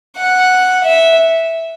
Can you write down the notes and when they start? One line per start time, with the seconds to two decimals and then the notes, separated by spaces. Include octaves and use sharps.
0.17 F#5
0.84 E5